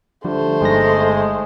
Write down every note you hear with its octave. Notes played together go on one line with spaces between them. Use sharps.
D3 F3 G3 A3 C5
G1 G#3 D#4 A#6